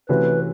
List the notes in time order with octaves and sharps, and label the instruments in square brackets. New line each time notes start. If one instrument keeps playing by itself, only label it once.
[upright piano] C3 E3 A3 C#4 F#4 [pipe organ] B4